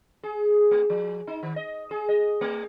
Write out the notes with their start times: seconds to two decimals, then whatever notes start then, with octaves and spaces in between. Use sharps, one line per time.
0.23 G#4
0.71 A3
0.90 F3
1.27 D#4
1.43 D#3
1.56 D#5
1.91 G#4
2.09 D#5
2.41 A3